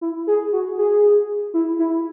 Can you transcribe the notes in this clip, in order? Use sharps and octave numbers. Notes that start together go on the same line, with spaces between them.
E4
G#4
F#4
G#4
E4
E4